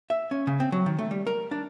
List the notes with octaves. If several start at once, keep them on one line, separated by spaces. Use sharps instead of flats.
E5
C#4
C#3
C4
F#3
D#3
A3
G3
A#4
D4